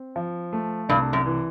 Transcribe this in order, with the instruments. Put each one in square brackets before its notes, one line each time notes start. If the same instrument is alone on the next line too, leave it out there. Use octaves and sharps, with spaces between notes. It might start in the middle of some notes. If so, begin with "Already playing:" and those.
Already playing: [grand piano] C4
F3
A3
[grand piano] C2 [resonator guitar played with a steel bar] G2
[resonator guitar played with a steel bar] F#2
[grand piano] E3